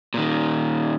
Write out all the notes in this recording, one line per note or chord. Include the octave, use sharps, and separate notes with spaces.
A#2 D#3